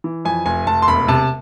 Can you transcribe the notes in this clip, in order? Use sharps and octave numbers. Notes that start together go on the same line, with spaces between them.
E3
F2 G#5
F1 G#5
F1 A5
C6
E1 B5
C3 A5